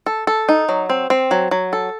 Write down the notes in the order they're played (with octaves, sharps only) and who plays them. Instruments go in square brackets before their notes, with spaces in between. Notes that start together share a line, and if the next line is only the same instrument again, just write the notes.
[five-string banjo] A4
A4
D#4
F#3
C4
C4
F#3
F#3
A4